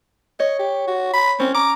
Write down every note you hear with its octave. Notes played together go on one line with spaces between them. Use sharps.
C#5 D#5
G4
F#4
B5
C4 C#4
A#5 D6